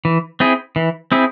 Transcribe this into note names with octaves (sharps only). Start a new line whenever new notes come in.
E3
C4 E4 G#4
E3
C4 E4 G#4